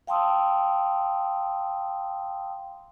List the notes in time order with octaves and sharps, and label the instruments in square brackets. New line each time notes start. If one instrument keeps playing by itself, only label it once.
[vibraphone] F5 G5 A5 C6 D#6 E6